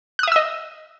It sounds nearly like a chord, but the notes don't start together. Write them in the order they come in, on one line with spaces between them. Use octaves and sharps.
F#6 D#6 E5 E6 D#5